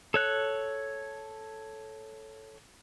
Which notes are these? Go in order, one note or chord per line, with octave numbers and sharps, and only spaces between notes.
A4 C#5 F#6